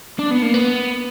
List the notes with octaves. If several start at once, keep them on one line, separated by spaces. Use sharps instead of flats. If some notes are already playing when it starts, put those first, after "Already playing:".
D4
B3
A#3
B3